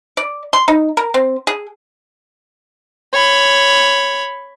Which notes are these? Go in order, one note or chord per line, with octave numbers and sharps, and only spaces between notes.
D5
C6
D#4
A#4
C4
G#4
C#5 B5